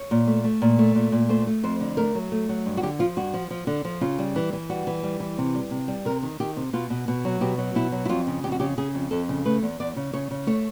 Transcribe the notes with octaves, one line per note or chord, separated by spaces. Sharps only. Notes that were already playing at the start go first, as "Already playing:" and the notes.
Already playing: C#5
A#2
A3
A3
A#2
A3
A#2
A#2
A3 C5
A3
F2 C5
D3
A3 A#4
F#3
A3
F#3
G2
F#4
D3 G4
F3 F4
G2 F#4
F3
F3
D3
F3
C#3 F4
G3
E3
E3
G3 F#4
E3
G3
E3
C3
G3
C3
G3
C3 A#4
D#3
D#3 G4
C3
B2 F4
B2
B2
F#3
B2 G4
F#3
B2 E4
F#3
E4
F2 F4
C#3
F2 G4
F#4
C#3 G4
C#3 G#4
F2
F2 A4
C#3
A3 B4
E2
E2 D5
C#3
C#3 C#5
C#3
A3 C#5